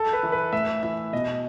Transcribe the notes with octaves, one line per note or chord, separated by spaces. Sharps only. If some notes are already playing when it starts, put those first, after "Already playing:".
Already playing: A4
B4
E3
B4
A2 E5
E3 E5
B2 D#5